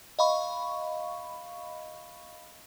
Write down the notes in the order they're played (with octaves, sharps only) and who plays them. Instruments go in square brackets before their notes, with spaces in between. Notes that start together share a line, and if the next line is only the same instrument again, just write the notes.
[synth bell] D#5 F5 B5 C#6